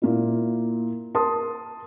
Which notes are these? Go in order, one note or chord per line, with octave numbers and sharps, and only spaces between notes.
A#2 A#3 E4
A#4 A5 C6 D#6